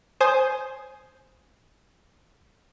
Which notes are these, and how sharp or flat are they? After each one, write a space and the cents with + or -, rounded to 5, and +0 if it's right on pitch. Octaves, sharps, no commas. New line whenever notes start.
C5 +0 G#5 +10 D#6 +0